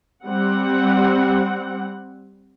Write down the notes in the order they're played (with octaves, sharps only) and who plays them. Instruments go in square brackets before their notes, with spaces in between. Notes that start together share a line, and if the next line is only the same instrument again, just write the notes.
[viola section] G3 C4 F#5